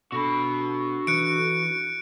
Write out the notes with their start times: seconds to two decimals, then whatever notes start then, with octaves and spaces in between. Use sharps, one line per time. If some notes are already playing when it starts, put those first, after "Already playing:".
0.12 B2 D4 F#4 A4 B5
1.07 E3 D#4 B4 F#6 C#7 D7